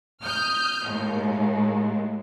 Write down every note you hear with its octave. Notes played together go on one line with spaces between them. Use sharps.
D#6 F6 G6
D#2 A2 G#3